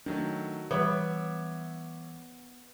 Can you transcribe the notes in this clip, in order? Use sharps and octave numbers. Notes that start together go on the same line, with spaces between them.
D#3 F#3 A3 D4
E3 G3 B3 C#5 E5 D6